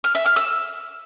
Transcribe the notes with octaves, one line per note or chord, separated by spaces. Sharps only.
F6
E5
F6
E6